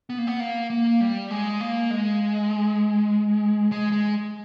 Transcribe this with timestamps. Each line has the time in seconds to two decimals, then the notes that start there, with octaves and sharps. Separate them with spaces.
0.10 B3
0.18 A#3
0.27 B3
0.40 A#3
0.70 A#3
1.00 G3
1.30 G#3
1.60 A#3
1.91 G#3
3.72 G#3
3.92 G#3